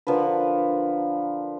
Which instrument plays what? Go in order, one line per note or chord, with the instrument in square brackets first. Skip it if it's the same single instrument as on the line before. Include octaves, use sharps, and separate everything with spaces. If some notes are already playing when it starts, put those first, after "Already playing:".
[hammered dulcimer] D3 F3 A#4 B4